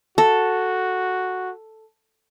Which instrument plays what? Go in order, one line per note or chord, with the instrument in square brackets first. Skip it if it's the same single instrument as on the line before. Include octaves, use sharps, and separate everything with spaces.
[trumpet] F#4 [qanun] A4